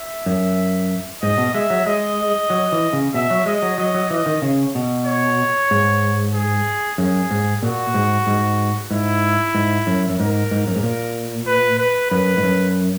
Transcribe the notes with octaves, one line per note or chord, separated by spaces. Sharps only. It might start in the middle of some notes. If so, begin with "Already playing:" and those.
Already playing: E5
F#2
G#2 D#5
B2
G#3 E5
F#3
G#3 D#5
F#3
E3
C#3
B2 E5
F#3
G#3 D#5
F#3
F#3 D#5
F#3
E3 D#5
D#3
C#3
B2
C#5
G#2
G#4
F#2 G#4
G#2
A#2 F#4
G#2
G#2
G#2 E4
G#2
F#2
F#2
G#2 A#4
G#2
F#2
G#2
A#2
B4
B4
F#2 B4
G#2
F#2